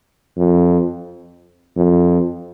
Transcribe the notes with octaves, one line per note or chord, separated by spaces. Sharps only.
F2
F2